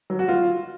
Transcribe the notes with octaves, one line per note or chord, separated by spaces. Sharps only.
F#3
F#4
F4